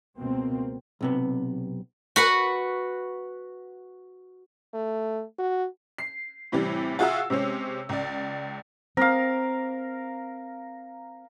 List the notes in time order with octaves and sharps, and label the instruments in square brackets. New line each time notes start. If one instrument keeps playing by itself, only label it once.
[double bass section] C#2 B2 A#3 C4
[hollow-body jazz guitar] B1 C3 B3
[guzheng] F#4 B4 F#5
[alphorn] A3
F#4
[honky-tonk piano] C7
A2 C3 E3 G3
F4 F#4 G#4 E5 F#5 E6
C3 G#3 C4 C#4
C#2 D5
[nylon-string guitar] C4 [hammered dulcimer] A#4 F5